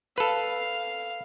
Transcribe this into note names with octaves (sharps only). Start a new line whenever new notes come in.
A4 B4 F5